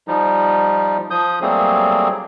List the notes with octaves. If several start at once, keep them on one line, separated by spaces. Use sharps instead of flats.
F3 G3 D#4
F3 D#6 G6
F#3 G3 A3 A#3 C4 G#4